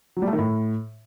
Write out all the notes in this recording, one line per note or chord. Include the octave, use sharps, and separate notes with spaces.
F#3
G3
A3
D#3
A2